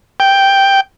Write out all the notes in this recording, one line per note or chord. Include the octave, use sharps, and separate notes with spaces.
G5